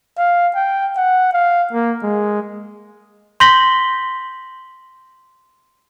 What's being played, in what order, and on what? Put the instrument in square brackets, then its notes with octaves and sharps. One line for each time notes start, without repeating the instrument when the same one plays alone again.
[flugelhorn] F5
G5
F#5
F5
A#3
G#3
[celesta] C6 G6 A#6 B6 F#7 G7